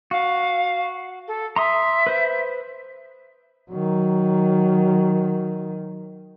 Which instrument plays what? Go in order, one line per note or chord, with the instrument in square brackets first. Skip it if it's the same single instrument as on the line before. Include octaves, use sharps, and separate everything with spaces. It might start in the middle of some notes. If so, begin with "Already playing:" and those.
[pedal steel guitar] F#4 [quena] F5
[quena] A4
[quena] E5 [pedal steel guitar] A#5 C6 D#6
[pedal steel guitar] B4 C5
[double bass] D#3 F#3